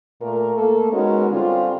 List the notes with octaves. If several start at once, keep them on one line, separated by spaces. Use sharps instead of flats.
A#2 A3 A#3 A#4
A3 A#3 A4
G#3 B3 C#4 D#4 F#4 A#4
D3 G3 C4 C#4 F4